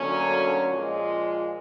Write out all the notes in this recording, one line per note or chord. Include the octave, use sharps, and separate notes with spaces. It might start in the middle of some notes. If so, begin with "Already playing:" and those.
Already playing: D2 D3 F#3 A#3 C#4
A#2 F3 G#3